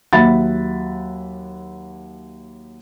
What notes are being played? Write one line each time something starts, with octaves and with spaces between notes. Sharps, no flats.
D#2 F#3 E5 F#5 B5 A6